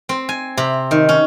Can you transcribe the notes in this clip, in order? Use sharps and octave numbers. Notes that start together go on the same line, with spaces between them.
C4
G#5
C3
D#3
C#4